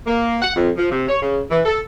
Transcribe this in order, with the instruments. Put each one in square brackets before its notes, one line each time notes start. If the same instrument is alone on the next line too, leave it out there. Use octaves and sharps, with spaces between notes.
[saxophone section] A#3
F#5
F2
F3
C3
C#5
C#3
E3
A4